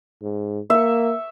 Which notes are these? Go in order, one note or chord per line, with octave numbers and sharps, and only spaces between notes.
G#2
A#3 E5 C#6